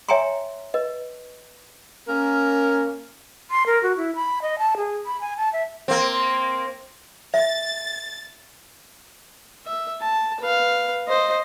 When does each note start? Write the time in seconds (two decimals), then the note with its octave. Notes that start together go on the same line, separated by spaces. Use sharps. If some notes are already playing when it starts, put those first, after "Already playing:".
0.09 C#5 E5 G5 G#5 A#5 C6
0.74 B4 D#5
2.07 A#3 C#4 A#4
3.51 C6
3.66 A#4
3.83 F#4
3.97 E4
4.15 B5
4.42 D#5
4.59 A5
4.77 G#4
5.06 B5
5.21 G#5
5.37 A5
5.53 E5
5.88 A#3 C4
7.34 E5 A6
9.66 E5
10.01 A5
10.40 B4 F5
11.08 C5 D#5